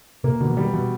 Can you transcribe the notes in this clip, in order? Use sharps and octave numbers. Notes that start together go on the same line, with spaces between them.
C3 A#3
B2 D3
E3
D#3 G3
B2 E3